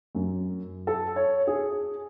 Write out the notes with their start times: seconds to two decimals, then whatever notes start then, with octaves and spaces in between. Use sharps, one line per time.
0.15 F#2
0.87 A4
1.16 C#5
1.47 G#4